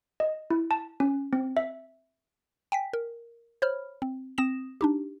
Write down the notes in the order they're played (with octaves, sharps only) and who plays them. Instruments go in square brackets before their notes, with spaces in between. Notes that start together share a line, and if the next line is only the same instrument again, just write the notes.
[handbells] D#5
E4
A5
C#4
C4
E5
[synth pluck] G5 G#5 B6
A#4
C5 C#5 B5 F6
C4
C4 D#6 A#6 E7
D4 D#4 G4